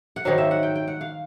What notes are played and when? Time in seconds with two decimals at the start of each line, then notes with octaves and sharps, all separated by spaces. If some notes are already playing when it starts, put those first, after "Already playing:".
0.16 F#5
0.25 G#2 D#3 F#3 F5
0.38 E5
0.51 F#5
0.63 G5
0.75 G5
0.88 F#5
1.01 F5